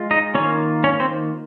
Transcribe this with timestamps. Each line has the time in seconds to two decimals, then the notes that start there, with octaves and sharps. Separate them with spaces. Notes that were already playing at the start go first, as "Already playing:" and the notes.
Already playing: G#3 F4
0.11 D#4 D#5
0.34 D#3 A#3 C#4 F4 C#5
0.84 C#4 C#5
1.00 C4 C5